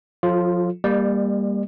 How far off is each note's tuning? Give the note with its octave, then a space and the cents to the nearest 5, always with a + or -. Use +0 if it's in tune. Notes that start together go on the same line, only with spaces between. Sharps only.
F3 +40 F4 +0 A4 -15
G3 +20 A#3 +0 D5 +45